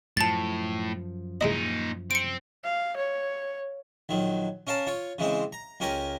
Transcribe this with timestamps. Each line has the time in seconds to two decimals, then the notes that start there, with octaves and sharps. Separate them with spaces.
0.17 F#2 A2 F3 A5 A6
1.41 A#2 G#3 D#4 E4 D#5
2.11 C4 C#7 D7
2.64 F5
2.97 C#5
4.09 A#1 D#3 F#3
4.67 C#4 A#4 F5 A5
4.87 F4 C#5
5.19 C#3 E3 G#3 C4
5.53 A#5
5.80 C#2 C#4 G4 A#4 G#5 A#5